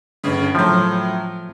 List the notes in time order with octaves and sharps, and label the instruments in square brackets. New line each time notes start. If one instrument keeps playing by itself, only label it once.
[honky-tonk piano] G1 C#3
[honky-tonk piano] A2 F#3 [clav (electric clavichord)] F3